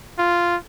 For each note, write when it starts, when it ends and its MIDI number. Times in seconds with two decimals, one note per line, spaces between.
0.19 0.56 65